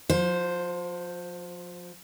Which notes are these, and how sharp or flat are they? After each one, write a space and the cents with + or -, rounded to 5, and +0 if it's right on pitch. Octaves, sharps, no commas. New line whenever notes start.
F3 +35 C5 +0